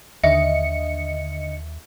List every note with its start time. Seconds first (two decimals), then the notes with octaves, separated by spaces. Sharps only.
0.24 D#2 D3 D#5 E5 C#7